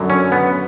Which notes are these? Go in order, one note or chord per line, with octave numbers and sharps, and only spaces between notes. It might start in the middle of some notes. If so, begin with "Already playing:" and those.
Already playing: F#2 D3 F#3
C#4
B3